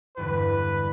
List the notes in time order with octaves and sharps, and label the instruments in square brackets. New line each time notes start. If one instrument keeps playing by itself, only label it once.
[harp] E2 G2 D3 [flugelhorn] B4